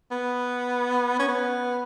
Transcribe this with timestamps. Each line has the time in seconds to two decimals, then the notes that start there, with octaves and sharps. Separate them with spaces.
0.11 B3
1.19 C#4
1.28 B3